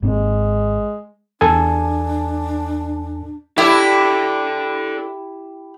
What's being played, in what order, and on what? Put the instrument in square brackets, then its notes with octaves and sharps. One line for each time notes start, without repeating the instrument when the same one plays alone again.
[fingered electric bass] G#1 A#3 C4 [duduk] G#3
[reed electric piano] E2 A4 G#5 [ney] D4
[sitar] E4 [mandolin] G4 [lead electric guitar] A4 D5